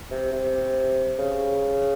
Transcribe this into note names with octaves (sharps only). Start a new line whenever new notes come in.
C3
C3
C#3